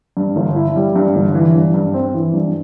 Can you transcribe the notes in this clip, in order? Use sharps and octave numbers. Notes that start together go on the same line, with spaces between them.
G2
G1
E4
G3
G2
G1
E3
G2
G2
C4
E3
G2